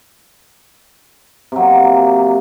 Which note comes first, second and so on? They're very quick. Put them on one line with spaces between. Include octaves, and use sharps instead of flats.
C3 F#3 A#3